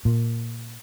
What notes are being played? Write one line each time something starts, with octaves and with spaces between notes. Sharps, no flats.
A#2